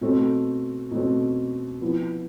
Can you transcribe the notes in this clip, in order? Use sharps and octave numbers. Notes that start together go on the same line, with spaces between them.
B2 A3 C4
B2 A3 C4
F3 B3 E4